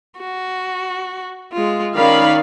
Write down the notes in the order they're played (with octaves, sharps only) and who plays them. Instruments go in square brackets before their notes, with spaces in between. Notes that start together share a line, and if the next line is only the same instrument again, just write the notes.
[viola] F#4
G#3 F4
[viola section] D#3 F5 B5 [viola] C#4 D5